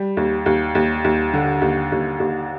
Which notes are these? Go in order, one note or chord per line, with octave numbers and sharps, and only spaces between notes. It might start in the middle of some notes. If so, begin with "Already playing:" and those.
Already playing: G3
D#2
D#2
D#2
D#2
D3
D#2
D#2
D#2